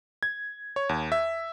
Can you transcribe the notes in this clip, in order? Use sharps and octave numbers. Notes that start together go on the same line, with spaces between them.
G#6
C#5
D#2
E5